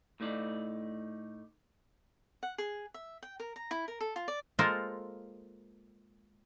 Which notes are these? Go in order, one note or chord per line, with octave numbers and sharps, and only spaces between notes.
A2 A3 D#4 D5
F#5
G#4
E5
G5
A#4
A#5
E4
A#4
A4
F4
D5
G#3 A#3 F4 A4 A#4 C5